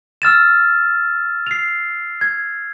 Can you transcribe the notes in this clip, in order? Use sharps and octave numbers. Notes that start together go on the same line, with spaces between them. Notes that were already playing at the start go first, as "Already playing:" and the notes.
E6 F6 A6 E7
C7 F7
G#6